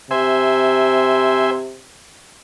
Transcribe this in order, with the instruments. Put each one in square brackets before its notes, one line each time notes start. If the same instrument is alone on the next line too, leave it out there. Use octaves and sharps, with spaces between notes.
[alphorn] C3 [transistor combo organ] C5 E5 G#5